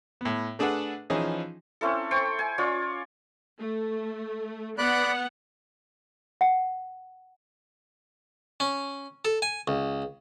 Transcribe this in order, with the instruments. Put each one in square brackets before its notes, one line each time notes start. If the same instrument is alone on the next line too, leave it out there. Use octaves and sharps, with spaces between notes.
[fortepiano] A2 B3
A3 D4 G#4 A4 B4 F#5
E3 F3 C#4 D#4 G#4
[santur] C4 C#4 E4 A4
C5 G5 C#6
G#5
C#4 F4 C#5 D5
[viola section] A3
[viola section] B3 F#5 [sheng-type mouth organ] D5 B5 F#6
[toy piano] F#5
[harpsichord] C#4
A4
G#5
C#2